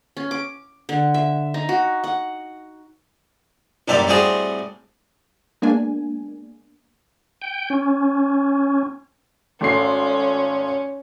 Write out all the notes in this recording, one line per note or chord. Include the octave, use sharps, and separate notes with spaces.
C#4
D6
D3
E5
D#4
F#4
F#5
A1 F#2 A#2 G3 G4 E5
A2 G3 C4 F#4 G#4
G#3 A#3 B3 D4 G#5
G5
C#4
G#1 A3 C#4 C7